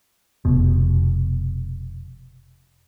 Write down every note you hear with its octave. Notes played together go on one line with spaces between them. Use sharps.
F1 B2